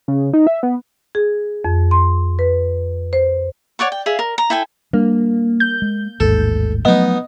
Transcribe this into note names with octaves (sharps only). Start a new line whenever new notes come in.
C#3
D#4
E5
B3
G#4
F2
C6
B4
C5
C#5 D5 F#5 C#6
G5
G#4 E5 F5
A#4
A#5
E4 A4 G5 G#5
G3 A#3 D4
G6
G#3
A1 D#2 G#2 A4
F3 F#3 A3 B3 D#4 D#5